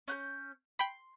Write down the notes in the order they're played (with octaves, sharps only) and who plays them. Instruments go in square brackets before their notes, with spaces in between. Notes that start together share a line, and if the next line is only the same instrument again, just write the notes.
[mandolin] C#4 F#6 G6
[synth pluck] G5 B5 [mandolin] C6